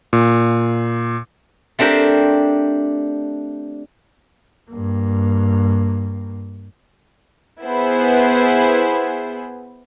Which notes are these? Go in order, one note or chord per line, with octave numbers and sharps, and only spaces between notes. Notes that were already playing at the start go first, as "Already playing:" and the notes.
A#2
A3 C4 D4 G4 A#4 C5
G2 A#3
B3 E4 G#4 B4 C5